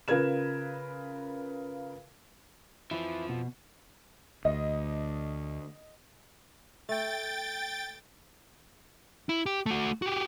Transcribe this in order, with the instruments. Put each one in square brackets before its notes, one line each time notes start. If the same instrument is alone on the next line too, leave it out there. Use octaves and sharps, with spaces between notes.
[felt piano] C#3 F4 A#4 B4 G#6 E7
[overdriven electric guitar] F2 F3 [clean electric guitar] E3 E4
[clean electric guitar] B2
[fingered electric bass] D2 [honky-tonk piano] D#5
[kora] A3 [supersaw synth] G5 A6
[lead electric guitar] E4
G4
A3 F#4
F#4 G4